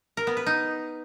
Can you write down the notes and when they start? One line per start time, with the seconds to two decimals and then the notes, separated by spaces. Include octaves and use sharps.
0.17 A#4
0.27 B3
0.37 B4
0.46 D#4